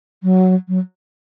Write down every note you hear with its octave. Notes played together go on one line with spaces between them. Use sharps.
F#3
F#3